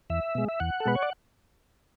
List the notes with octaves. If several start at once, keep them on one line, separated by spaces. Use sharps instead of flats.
E2 E5
B2 G#3
E5
E2 F#5
A4
B2 G#3 B4
C#5
D5